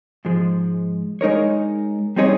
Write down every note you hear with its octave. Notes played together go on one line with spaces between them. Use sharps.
G#2 F3 G#3
G#3 D#4 A#4 C#5
G3 C4 D#4 G#4 C#5